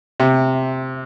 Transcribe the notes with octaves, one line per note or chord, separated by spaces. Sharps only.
C3